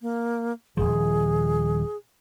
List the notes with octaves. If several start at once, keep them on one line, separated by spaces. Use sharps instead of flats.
A#3
D#1 C#2 F3 G#4